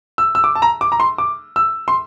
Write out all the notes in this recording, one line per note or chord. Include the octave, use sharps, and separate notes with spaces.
E6
E6
D6
A5
A#5
D6
A#5
C6
D6
E6
C6